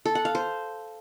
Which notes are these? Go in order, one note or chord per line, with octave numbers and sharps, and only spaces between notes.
A4
F#5
F5
C5